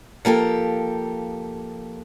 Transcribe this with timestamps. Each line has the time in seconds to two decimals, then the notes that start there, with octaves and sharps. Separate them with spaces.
0.25 F3 A#3 G4 A4